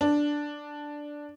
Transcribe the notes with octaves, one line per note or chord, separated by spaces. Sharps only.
D4